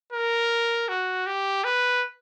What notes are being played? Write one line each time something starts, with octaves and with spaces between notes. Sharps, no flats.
A#4
F#4
G4
B4